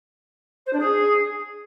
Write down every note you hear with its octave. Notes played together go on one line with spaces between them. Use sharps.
C5
D4
G#4